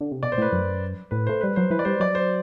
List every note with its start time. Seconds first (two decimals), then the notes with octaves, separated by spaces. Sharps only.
0.01 D3
0.12 C3
0.23 B2 D5
0.32 C5
0.38 A2 B4
0.53 F#2
1.11 A2 B4
1.27 A3 C5
1.41 G3 B4
1.56 F#3 C5
1.70 E3 B4
1.79 D5
1.85 G3 C5
2.00 F#3 D5
2.15 C5